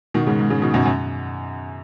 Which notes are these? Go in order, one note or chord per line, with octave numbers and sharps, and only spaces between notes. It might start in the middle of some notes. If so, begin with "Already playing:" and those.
B2 D#3
G#2 C#3
G#2
G#2 C#3
B2 D#3
F#2 B2
F#2